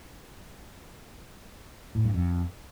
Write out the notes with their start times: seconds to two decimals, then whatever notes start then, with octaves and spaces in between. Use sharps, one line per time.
1.95 A2
2.05 G2
2.14 F2